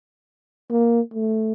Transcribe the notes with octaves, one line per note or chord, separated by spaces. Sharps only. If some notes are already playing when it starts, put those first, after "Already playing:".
A#3
A3